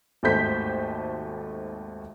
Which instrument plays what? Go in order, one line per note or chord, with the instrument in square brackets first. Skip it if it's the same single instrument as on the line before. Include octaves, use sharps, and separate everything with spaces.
[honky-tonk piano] G#1 D#2 A3 C5 G6 B6